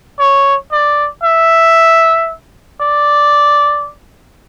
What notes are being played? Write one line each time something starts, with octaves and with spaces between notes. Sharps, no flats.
C#5
D5
E5
D5